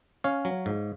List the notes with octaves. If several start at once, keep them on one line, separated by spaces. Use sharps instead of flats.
C#4 C#5 F5
F#3
G#2